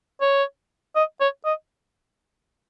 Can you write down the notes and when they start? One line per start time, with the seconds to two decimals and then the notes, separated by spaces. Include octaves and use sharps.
0.21 C#5
0.96 D#5
1.20 C#5
1.45 D#5